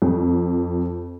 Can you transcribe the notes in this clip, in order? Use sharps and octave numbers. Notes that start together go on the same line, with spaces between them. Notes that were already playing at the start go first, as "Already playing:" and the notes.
F2